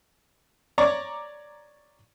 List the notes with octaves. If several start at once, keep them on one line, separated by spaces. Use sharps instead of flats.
C#5 D5 A#5 C#6 D6